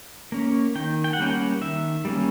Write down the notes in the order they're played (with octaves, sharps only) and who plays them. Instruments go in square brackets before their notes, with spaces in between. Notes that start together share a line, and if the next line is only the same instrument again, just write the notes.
[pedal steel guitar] A#3 C#4
D#3 G5
G5
F#5
G3 A#3 C#4 G5
F#5
D#3 E5
G3 A#3 C#4